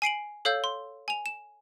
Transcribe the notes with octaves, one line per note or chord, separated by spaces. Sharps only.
G#5 C7 D7 F#7
A4 C#5 F5 E6 G6
C6
G#5 F7
E7